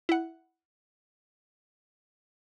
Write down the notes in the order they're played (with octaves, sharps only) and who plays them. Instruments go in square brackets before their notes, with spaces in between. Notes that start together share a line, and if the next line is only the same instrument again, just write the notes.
[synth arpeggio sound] E4 F#5